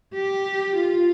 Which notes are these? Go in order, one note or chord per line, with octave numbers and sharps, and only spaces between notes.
G4
F4